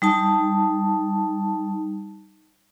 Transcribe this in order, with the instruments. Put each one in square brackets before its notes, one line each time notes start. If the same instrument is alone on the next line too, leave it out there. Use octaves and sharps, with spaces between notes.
[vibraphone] G3 D#4 A5